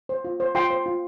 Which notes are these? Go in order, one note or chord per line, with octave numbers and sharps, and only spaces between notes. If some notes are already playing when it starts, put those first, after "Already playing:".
C5
F4
C5
F4 G5 C6
C5
F4